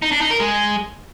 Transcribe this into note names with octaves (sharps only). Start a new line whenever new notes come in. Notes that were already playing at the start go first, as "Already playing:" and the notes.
D#4
D4
D#4
A#4
G#3